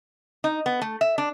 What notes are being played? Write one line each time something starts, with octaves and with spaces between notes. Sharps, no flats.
D#4
B3
A3
E5
D4